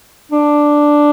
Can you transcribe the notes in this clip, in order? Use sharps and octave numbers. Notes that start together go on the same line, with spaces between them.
D4